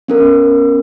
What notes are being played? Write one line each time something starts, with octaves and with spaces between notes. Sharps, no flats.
B3 C#4 A#4